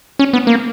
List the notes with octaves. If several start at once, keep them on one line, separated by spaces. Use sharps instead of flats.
C#4
B3
A#3